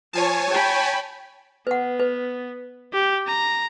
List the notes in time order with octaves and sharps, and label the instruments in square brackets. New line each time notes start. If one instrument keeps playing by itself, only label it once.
[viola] F3 [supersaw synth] C#5 G#5 A5
[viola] G5 B5
[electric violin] B3 [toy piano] B4 F#5
[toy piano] B4
[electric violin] G4
A#5